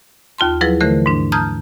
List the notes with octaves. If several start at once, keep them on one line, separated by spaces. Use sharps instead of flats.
D#2 F4 A5 C6
F3 F#3 E4 G#4 B4
D3 E3 A3 A#4 C5
G#2 D4
A5 A#5 D#6 F6 G6 G#6